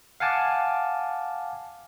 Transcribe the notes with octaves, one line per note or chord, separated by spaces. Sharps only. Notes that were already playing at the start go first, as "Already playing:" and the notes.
F5 F#5 G#5 A5 D6